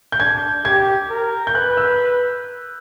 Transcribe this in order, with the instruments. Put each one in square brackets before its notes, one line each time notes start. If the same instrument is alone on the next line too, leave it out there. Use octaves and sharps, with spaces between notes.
[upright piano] G6
[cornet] D4 [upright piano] G#6
[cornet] G4 [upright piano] G#6
[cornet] A#4
[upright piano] G6
[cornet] B4 [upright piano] F#6
[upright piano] E6